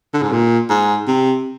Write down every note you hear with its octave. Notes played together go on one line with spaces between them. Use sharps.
D3
G#2
A#2
G#2
C3